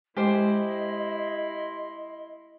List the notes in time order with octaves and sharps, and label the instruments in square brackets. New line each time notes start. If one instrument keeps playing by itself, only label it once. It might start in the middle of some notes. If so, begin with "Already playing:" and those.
[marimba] G#3 [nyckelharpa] E4 C6 [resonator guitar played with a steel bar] G4 C5 [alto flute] D#5